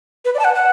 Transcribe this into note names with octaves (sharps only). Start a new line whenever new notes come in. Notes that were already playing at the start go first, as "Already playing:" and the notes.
B4
D5
A5
F#5
F#5